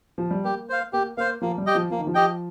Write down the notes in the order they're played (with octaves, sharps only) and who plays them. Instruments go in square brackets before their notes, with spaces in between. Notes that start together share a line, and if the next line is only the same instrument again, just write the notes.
[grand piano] F3
G3
[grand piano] A#3 [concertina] G4
[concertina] C5 F5
[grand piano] A#3 [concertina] G4
[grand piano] A#3 [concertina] C5 F5
[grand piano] F3 [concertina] A#3
[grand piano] G3
[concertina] G4 D#5 G5
[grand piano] F3
[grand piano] F3 [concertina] A#3
[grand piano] D#3
F3
[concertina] G4 D#5 G5